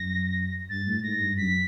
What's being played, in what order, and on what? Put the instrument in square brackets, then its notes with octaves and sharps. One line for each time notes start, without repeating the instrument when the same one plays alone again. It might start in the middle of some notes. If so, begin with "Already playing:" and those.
Already playing: [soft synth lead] F#2 [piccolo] A#6
[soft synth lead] G2 [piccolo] A6
[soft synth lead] A2
[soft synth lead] G#2 [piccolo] A#6
[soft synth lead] G2
[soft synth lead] F#2 [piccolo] B6